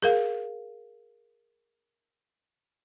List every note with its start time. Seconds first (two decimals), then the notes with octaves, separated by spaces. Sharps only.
0.02 G#4 A#4 F5